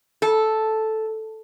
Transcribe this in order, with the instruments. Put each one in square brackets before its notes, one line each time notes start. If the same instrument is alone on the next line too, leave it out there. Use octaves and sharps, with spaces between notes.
[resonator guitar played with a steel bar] A4